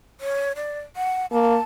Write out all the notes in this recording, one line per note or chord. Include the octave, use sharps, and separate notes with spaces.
C#5
D5
F#5
A#3 A5